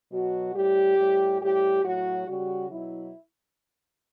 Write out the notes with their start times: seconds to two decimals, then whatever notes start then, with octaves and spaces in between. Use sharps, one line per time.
0.11 B2 F#3 F#4
0.54 A2 G3 G4
0.97 A2 G3
1.40 A2 G3 G4
1.83 A2 F#3 F#4
2.27 C#3 G3 F#4
2.70 B2 F#3 E4